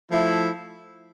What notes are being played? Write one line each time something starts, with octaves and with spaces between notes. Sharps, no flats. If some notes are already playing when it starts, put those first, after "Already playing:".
F3 A3 E4